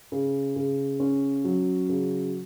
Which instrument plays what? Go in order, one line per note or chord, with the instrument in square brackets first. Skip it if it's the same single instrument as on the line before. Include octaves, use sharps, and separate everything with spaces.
[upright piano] C#3
C#3
C#4
F#3
C#3